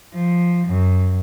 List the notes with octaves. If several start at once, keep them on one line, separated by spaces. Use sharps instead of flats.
F3
F#2